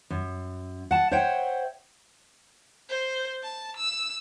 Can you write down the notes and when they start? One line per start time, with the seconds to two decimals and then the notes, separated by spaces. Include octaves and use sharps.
0.10 F#2
0.91 F#5 A5
1.11 C5 C#5 E5 F#5 G5
2.89 C5
3.43 A5
3.77 E6